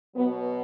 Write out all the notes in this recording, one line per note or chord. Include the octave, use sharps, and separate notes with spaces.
B2 F#3 B3